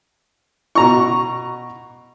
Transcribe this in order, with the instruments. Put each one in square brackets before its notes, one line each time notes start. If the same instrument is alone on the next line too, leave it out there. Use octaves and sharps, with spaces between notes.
[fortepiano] B2 A#5 C#6